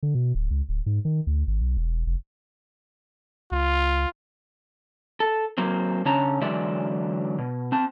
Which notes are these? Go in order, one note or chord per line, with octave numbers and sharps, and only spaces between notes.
D3
B2
D1
C#2
D1
G#2
D#3
D2
G#1
B1
E1
F1
C#2 F4
A4
F#3 A#3 C4
C#3 C#4 D4 C#5 A5 A#5
D3 E3 F#3 G#3 D5 E5
B2
C4 A5